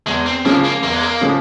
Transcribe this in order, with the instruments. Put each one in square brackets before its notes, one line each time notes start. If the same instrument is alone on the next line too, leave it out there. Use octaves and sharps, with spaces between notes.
[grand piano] E2 [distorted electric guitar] G#3
[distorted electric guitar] C4
[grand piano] C#3 F3 G#3 [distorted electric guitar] A#3
[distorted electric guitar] A#3
[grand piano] E2 [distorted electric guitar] A#3
[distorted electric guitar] G#3
A#3
[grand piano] C#3 F3 G#3